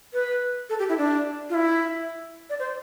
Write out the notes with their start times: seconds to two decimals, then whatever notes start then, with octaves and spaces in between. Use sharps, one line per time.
0.14 B4
0.69 A4
0.79 G4
0.89 E4
0.98 D4
1.50 F4
1.54 E4
2.50 D5
2.59 C5